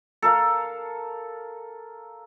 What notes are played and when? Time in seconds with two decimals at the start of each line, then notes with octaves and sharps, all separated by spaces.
0.22 A4 A#4 F5